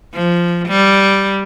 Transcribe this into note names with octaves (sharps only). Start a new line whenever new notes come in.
F3
G3